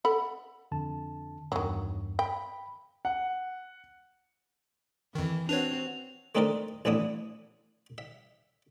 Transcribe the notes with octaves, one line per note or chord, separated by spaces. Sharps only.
A4 F#5 B5
F2 D3 A5
E2 G2 D#3 F#3
G5 B5
F#5
F2 D#3 E3
C4 D4 F#4 B4 C#5 F7
A3 C4 D4 D#4 A4 A#4
A1 A2 B3 D4 E4 D#6
E5